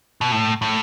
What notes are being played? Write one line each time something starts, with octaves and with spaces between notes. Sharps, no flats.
B2
A2
A2